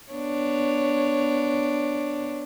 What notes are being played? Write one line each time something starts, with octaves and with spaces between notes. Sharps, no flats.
B3 D4 C#5